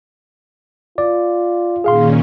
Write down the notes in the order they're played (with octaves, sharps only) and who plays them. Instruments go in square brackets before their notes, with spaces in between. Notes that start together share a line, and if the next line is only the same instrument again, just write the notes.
[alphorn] F4 [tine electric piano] D5
[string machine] A#2 D#3 C#4 [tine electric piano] G#4 F5 C6